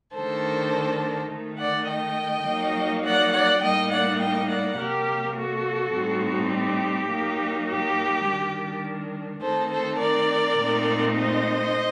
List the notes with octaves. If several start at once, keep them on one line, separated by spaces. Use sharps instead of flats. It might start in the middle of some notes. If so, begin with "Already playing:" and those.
D#3 A3 D4 A4 C5
D#3 A3 D#4
D5 F#5
D#5 G5
F#3 A#3 D#4
D5 F#5
D5 F#5
A2 G3 A#3 D#4 D#5 G5
D5 F#5
D#5 G5
D5 F#5
C3 F#3 A#3 G4 A#4
F#4 A4
A2 G3 C4 D#4
G4
F#3 A#3 D#4
G4
D#3 G3 D4
D#3 A3 C4 D#4 A4 C5
A4 C5
A#4 D5
A#2 A3 C4 D#4
C5 D#5